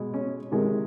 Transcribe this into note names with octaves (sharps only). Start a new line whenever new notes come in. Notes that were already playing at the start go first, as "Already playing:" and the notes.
Already playing: B2 G#3
C#4
C3 D#3 G#3